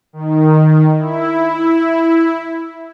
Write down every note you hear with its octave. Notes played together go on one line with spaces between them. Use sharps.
D#3
E4